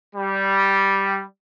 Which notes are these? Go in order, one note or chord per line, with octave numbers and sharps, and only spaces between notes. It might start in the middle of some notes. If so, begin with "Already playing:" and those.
G3